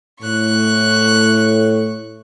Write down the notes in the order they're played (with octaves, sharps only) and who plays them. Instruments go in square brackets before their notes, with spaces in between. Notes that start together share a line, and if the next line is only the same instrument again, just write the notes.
[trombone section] A2 [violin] C#6 F#6